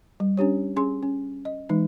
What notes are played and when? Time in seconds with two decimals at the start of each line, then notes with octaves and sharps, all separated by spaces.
0.20 G3
0.37 C#4 D4 G4 C#5
0.76 C#4 G#4 C6
1.03 C#4
1.45 D#5
1.69 E3 G#3 D#4